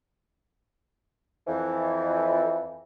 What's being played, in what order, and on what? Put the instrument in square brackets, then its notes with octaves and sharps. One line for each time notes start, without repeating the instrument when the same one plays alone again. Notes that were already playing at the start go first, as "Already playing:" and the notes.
[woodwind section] F2 E3